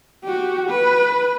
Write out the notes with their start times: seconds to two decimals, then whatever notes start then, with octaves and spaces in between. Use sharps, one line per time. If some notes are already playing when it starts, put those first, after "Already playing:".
0.24 F#4 G4
0.69 B4